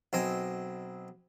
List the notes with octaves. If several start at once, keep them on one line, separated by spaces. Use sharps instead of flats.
B1 C4 D#5 G#5